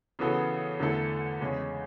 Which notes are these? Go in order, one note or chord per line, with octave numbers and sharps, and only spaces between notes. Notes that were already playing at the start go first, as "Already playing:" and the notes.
C#3 E3 B3 F#4 A4
E2 D3 A3 E4 A4
E2 C#3 G#3 C#4